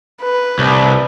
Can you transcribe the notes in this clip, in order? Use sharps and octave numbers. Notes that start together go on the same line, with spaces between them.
B4
C2